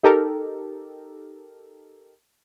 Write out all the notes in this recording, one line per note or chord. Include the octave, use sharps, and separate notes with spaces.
D#4 G4 A4 A#4